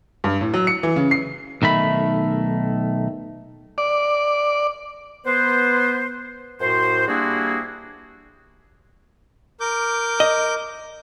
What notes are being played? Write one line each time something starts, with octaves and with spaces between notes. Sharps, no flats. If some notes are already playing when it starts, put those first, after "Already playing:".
G2
A2
F#3
C#7
E3
C#3
C7
B1 D#3 A3 B5
D5
B3 B4 C5
F#2 A2 F#4 C5
G3 A#3 D4 E4 F#4 G#4
A#4 D6 G6
D#5